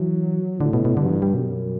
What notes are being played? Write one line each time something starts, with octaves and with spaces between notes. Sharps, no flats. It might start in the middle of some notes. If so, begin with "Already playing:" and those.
Already playing: E3 F#3
A2 D3
B2
B2
G2 D3
F#3
E3
G3
F#2 B2